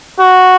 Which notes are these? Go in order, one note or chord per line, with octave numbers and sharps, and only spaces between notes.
F#4